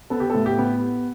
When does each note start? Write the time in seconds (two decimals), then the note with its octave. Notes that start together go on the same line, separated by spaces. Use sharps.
0.10 B3 A4
0.20 G4
0.30 A2 A4
0.46 G4
0.59 B3